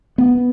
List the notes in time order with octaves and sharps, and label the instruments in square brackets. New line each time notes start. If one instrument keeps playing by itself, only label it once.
[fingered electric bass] B3